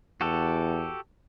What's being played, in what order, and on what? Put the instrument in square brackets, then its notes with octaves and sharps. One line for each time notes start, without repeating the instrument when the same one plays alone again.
[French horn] E2 [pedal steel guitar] F#4 G4 A4